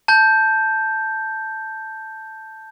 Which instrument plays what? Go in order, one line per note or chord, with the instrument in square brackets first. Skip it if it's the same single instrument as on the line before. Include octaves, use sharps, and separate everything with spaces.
[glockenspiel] A5 G6